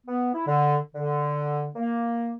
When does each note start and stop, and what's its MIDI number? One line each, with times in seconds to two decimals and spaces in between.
0.06 0.31 59
0.34 0.46 64
0.47 0.77 50
0.95 1.68 50
1.76 2.35 58